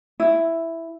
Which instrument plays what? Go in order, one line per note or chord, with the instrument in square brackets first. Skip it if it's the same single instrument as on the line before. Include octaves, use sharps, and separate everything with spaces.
[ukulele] E4